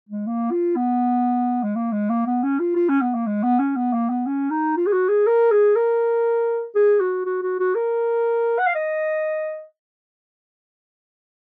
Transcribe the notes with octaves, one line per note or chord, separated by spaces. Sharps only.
G#3
A#3
F4
B3
G#3
A#3
G#3
A#3
B3
C#4
F4
F4
C#4
B3
A#3
G#3
B3
C#4
B3
A#3
B3
C#4
D#4
F4
G#4
F#4
G#4
A#4
G#4
A#4
G#4
F#4
F#4
F#4
F#4
A#4
F#5
F5
D#5